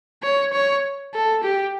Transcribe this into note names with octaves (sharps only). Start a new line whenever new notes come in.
C#5
C#5
A4
G4